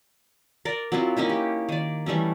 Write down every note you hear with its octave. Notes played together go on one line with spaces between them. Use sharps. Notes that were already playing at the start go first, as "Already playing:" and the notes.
A#4 D5
F#3 C4 E4 F4
A#3 C#4 D#4 E4
G4
D#3 D5
E3 G3 A3 C#4